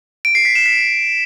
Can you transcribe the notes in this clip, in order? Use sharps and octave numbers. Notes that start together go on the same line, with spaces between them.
D7
C7
B6
E7
B6